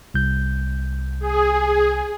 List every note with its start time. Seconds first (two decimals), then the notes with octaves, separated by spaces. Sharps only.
0.14 C2 G6
1.19 G#4